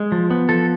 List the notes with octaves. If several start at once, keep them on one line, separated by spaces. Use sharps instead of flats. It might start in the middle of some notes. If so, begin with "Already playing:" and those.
Already playing: G#3
F3
B3
F3 A4